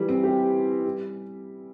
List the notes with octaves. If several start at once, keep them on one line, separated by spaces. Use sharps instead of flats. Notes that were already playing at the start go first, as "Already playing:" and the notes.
Already playing: E3 G3
C4
G4
G3